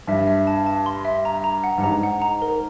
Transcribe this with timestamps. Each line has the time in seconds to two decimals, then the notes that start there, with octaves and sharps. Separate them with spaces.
0.07 G2 E5
0.27 E5
0.47 A5
0.66 A5
0.86 C6
1.05 E5
1.25 A#5
1.44 A#5
1.64 F#5
1.78 G2
1.83 G#2 A#5
2.03 F#5
2.22 A#5
2.42 A#4